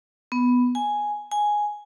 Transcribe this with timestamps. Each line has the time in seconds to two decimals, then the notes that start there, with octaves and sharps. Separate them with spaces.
0.32 B3
0.75 G#5
1.31 G#5